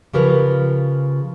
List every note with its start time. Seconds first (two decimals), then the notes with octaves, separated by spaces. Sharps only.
0.13 C#3 F3 G4 A#4 B4